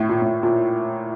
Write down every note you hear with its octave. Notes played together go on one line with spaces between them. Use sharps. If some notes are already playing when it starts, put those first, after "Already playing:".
Already playing: A2
A#2
A2
A#2